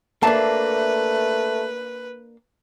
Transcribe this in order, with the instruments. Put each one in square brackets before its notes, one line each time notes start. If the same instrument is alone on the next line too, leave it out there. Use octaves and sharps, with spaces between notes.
[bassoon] A3 [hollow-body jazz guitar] A#3 D4 [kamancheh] B4 [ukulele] E5 A5